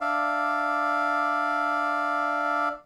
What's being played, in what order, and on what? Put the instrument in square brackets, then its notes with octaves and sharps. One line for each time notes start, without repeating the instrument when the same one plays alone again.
[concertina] D4 D5 E5 F5